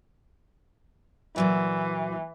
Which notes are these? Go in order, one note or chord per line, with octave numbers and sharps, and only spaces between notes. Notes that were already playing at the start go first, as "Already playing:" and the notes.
A#2 E3 F#3 D5